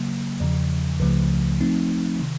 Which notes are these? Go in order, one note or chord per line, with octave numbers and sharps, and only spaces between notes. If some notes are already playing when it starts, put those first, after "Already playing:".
Already playing: C#3 F#3 A#3
E2 C#3 F3
C#2 C#3 F3 A3
F3 A3 C4 D#4
C3 D#3